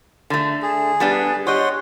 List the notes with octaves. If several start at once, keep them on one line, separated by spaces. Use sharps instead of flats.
D3 A3
G#4
G3 B3 D4
G4 C#5 D#5 F#5 C6